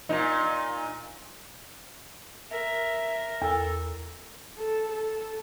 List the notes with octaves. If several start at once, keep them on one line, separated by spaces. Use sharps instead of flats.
A#2 D#4
A#4 E5
E2 A4
A4
A4